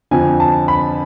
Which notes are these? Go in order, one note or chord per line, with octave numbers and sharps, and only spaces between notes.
F2 D3 F3 G#5
A5
B5